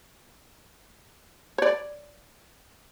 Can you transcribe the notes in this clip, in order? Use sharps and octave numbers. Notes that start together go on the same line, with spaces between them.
C#5 D5